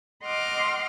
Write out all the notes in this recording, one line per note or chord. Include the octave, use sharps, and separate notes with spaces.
D#5 F#5 C6 D6 F6